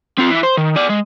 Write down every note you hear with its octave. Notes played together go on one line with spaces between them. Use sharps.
C4 F4
E3 E4
C5
D#3
G#4 D5
G#3